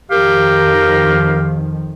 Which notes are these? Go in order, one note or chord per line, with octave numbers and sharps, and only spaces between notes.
F2 D#3 F3 G4 A#4 F5